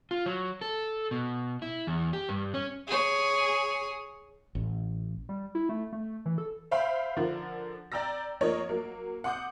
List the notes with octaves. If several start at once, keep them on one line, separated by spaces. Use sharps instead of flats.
F4
F#3
A4
B2
E4
E2
G4
G2
C#4
G#4 C#5
A1
G3
E4
A3
A3
E3
A4
C5 E5 F5 G5 B5 C6
D3 F3 A#4
D5 G5 A#5 E6 A#6
F3 A#3 C#5 D#5
F#3 A#3
F#5 C6 D6 D#6 G6